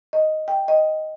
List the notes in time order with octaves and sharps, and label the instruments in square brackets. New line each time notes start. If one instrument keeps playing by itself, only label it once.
[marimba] D#5
G5
D#5